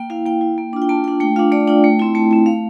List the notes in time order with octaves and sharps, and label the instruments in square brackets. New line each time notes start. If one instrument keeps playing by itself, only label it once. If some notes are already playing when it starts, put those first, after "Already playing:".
Already playing: [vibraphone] A#3 G5
E4 F5
A#3 G5
E4
A#3
D4 F4
G5
A#3 A5
D4 F4 G5
A3 G5
D4 F4 F5
A3 D5
D4 F4 G5
A3
C4 E4
A3 A5
C4 E4
A3 F5